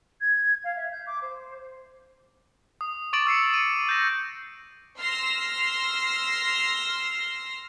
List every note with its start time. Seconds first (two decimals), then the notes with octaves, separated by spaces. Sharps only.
0.20 G#6
0.64 F5
0.76 E5
0.91 G6
1.06 D6
1.21 C5
2.81 D#6
3.13 C#6 D6 A6 D7 F#7
3.27 E6 C7 C#7
3.54 D#7
3.89 G6 A#6
5.00 C6 E6 F6 A#6 C7